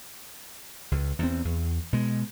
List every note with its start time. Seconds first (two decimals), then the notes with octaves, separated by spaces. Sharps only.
0.91 C#2
1.19 E2 C4
1.45 E2
1.93 B2 G#3